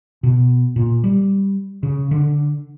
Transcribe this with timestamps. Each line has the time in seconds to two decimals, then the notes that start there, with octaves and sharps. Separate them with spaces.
0.23 B2
0.76 A#2
1.04 G3
1.83 C#3
2.11 D3